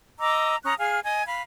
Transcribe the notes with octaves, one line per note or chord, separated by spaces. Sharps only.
D#5 A#5 D6 E6
C#4 A#5 D#6 F#6
G#4 F5 F6
D#5 G#5 G#6
F5 B5